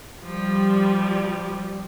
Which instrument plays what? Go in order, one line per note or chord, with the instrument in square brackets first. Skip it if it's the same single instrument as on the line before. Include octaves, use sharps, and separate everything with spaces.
[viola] F3 [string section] G3